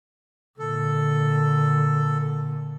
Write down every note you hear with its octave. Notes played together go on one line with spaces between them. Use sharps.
A#2 D3 A4